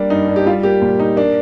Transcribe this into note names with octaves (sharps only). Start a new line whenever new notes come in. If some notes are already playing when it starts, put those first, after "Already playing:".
Already playing: G3 A#3 D4
G2 D#4
G2
G4
G3 F4
A#3 G4
A#2
A#2 D#4
A#3 D4